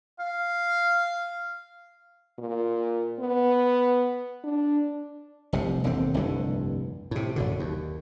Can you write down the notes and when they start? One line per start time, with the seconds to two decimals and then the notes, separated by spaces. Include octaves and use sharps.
0.19 F5
2.39 A#2
3.20 B3
4.44 D4
5.53 F1 C2 C3
5.84 E1 D#2 D3 C4
6.14 F1 C2 G2 D3
7.11 A2 C3
7.36 F#1 B2 D3
7.59 D#2